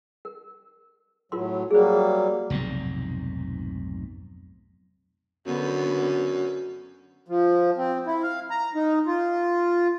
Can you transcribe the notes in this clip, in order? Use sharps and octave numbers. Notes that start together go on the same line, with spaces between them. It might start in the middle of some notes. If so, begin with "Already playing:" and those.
A#4
A2 F#3 F4 A#4 C6
F#3 G3 A#3 G#4 C5
F1 B1 G#2 C3
F#2 D3 B3
F3
C4
E4
F5
A#5
D#4
F4